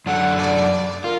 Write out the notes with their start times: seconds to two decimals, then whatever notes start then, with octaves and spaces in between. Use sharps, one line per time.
0.06 F#2 D4 A4 F#5
0.37 D5
1.04 F4 A#4